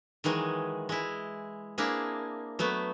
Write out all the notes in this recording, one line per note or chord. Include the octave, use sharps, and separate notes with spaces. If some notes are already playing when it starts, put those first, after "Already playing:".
D#3 E3 F#3 G#3 G#4
G#3 E4
A#3 C4 D4 E4 G#4
F#3 A3 B3